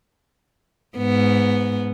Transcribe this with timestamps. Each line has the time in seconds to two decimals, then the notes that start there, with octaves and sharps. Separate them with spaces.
0.97 G#2 B3